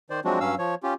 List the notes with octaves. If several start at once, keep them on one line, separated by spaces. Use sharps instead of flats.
D#3 C5 D5
F3 F#3 G#3 C4 D4 F#4
G2 F#3 C#4 F5 E6
F3 C#5
C#4 F4 G4